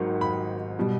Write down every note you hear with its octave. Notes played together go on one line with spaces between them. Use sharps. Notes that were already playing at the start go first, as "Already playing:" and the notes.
Already playing: G#1 G#2 D#3 F#3
B5
B2 G3